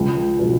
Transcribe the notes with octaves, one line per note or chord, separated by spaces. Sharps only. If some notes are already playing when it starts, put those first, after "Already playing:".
Already playing: C#2
B2 G#3